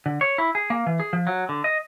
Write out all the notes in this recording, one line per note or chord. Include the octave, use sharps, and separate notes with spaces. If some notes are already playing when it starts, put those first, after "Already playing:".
D3
C#5
E4
G#4
A#3
E3
G#4
F3
F#3
D3
D#5